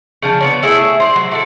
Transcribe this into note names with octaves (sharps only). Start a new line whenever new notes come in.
C#3 F3 D4
B3 D4 C#5
A3 E4 G#4 E5
C5 D5
F#3
A3 E4 A4